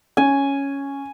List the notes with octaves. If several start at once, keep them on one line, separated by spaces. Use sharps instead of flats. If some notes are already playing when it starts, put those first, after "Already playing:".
C#4 G#5